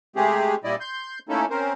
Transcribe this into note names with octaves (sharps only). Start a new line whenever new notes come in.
C3 G#3 A3 C4 G4 G#4
A#2 G3 E4 D5 D#5
C6 G6
A3 A#3 C#4 D#4 E4 A4
C4 C#4 A#4 C5